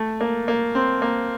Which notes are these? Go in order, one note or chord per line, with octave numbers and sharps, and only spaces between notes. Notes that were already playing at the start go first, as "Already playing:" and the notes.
Already playing: A3
A#3
A#3
C4
A#3